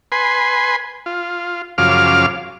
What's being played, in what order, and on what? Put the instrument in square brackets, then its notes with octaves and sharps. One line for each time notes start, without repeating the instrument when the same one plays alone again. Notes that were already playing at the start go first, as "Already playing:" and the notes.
[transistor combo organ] B4 G#5 C6
F4
F#2 C#3 F3 F5 D6 F6